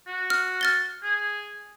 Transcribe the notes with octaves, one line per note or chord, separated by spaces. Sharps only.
F#4
F6
F6 A6 G7
G#4